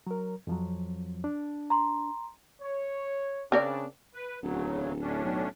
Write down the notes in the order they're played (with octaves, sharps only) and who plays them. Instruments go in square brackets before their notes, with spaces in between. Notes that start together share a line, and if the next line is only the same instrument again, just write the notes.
[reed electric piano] F#3 A#4
F2 F3 F#3
D4
[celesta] A#5 C6
[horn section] C#5
[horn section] C#3 D4 [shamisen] C4 A#4 D5
[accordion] B4
[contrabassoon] D1 [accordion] E2 C#3 F#3
[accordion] A2 C#4 D4
[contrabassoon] B1